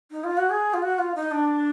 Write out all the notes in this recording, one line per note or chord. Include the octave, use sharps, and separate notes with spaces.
D#4
F4
F#4
G#4
F4
F#4
F4
D#4
D4